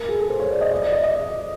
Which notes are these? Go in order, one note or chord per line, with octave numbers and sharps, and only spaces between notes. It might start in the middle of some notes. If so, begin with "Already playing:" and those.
Already playing: A#4
G#4
A4
C5
C#5
D5
D#5
D5
D5
D#5
D#5